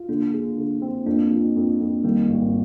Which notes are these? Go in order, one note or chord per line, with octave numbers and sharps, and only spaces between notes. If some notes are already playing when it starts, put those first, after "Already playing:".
Already playing: F4
D3 A#3 D4
G#3
D3
C4
F2 A#3 D4
F3
F2
F2
D#3 G3 A#3
G#1